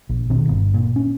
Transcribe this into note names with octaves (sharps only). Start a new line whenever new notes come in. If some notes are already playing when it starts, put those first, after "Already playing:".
A#1
D#1 B2 D#3 C4
G1
A#2
C#4